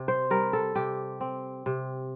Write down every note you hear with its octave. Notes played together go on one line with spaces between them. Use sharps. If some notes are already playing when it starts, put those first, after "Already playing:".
Already playing: C3
C5
G3 A#4
A4
C3 G4
C4
C3